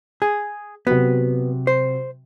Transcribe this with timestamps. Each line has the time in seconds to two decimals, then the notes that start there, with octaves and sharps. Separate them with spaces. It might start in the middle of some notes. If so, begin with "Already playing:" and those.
0.22 G#4
0.87 C3 F#3 B3 F#4
1.67 C5